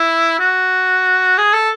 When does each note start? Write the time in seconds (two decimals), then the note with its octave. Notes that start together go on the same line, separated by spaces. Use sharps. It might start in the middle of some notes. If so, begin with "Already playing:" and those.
Already playing: E4
0.39 F#4
1.38 G#4
1.53 A4